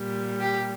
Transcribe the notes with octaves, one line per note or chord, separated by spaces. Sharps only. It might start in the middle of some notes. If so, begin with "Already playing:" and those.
Already playing: A#2 G3
G4